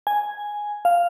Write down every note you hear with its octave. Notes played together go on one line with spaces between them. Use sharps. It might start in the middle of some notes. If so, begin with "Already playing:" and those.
G#5
F5